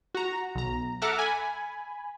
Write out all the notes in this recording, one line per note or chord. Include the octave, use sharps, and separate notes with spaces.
F#4 A#5
B1 A#5
A4 E5 F#5 A#5 D6 F6
G#5 B5